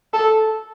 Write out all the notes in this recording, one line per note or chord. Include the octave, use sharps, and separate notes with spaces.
A4